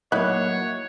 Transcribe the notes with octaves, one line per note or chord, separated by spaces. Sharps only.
F#3 A#3 D#4 E4 C#5 F#5